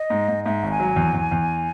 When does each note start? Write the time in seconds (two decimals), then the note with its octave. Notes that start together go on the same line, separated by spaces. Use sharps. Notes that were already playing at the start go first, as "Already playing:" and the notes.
Already playing: D#5
0.10 G#2
0.28 G#2
0.46 G#2 E5
0.63 G#1
0.71 G#5
0.80 F#3
0.96 E2
1.14 E2
1.31 E2